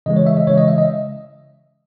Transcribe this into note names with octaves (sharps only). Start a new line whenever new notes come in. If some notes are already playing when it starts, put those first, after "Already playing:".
C#3 E3 G#3 D#5
C#5
E5
D#5
C#3 E3 G#3 C#5
D#5
E5
D#5